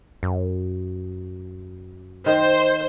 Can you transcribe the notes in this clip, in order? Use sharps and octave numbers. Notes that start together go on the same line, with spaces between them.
F#2
D#3 C5